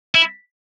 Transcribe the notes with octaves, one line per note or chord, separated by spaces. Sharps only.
E4